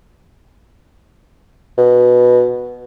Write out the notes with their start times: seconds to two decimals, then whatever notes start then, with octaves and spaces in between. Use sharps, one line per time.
1.78 B2